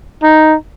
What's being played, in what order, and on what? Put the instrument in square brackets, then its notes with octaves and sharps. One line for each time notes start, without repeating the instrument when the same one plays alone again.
[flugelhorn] D#4